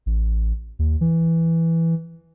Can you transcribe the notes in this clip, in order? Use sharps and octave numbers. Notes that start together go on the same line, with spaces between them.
A1
D#2
E3